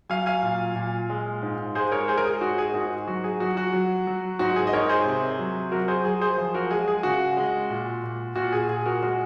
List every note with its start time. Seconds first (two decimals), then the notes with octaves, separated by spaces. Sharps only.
0.09 F#3 F5 G#5
0.26 F5 G#5
0.43 A#2
0.76 A#2
1.10 G#3
1.43 G#2
1.75 G#3 G#4 C5
1.92 A#4 C#5
2.08 G#3 G#4 C5
2.18 A#4
2.25 G#4
2.41 G#2 F#4
2.58 G#4
2.74 G#2 F#4
3.07 F#3 F#4
3.24 G#4
3.40 F#3 F#4
3.57 F#4
3.73 F#3
4.07 F#3
4.39 G#2 F#4
4.56 G#4
4.67 D#5
4.73 G#2 A#4 C#5
4.89 G#4 C5
5.05 C3
5.39 F#3
5.72 F#3 F#4 A#4
5.88 G#4 C5
6.05 F#3 G#4
6.21 G#4 C5
6.38 F3
6.54 F#4 A#4
6.71 G#3 G#4
6.88 G#4
7.03 C#3 F#4
7.37 G#3
7.70 A#2
8.04 A#2
8.36 A#2 F#4
8.53 G#4
8.69 A#2 G#4
8.86 F#4 A#4
9.02 G#3 F#4